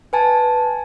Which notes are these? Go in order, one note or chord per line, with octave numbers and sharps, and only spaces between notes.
B4 G#5 A5